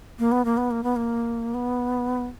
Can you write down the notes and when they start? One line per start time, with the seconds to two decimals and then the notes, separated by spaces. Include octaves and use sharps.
0.19 A#3
0.32 B3
0.45 A#3
0.57 B3
0.71 A#3
0.84 B3
0.96 A#3
1.54 B3